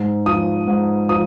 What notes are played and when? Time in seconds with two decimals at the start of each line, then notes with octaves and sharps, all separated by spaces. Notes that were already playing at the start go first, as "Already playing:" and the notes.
Already playing: G#2
0.26 F3 D#6
0.68 G#2
1.09 F3 D#6